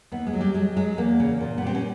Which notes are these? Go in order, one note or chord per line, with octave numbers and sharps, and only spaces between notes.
D#2 B3
G#3
F#3
G3
F#3 G#3
F#3 G#3
E2 A#3
C#3
A#2
B3
G3 C4
C#4